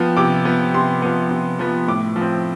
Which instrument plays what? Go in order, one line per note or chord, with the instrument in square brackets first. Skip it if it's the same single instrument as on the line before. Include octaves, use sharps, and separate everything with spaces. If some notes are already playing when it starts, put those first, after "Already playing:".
Already playing: [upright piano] F3 B3 G5
C3 D6
F3 B3
C3 C6
F3 B3
C3
F3 B3
A2 D6
F3
C4